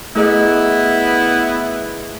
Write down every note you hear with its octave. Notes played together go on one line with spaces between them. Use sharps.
A3 B3 E4 G#4 D#5